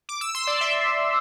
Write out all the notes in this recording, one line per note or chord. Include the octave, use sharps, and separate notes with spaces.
D6
E6
C6
D5
E5